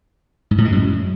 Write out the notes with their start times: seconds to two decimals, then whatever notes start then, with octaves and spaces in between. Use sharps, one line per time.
0.51 G#2
0.58 A2
0.65 G#3
0.72 F#2